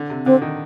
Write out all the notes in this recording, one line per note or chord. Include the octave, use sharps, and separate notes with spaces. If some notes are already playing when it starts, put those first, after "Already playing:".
Already playing: D3
C3
D3 C4
D#3